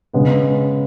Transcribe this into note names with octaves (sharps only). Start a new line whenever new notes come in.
C#3 G#3 B3 G#4 B4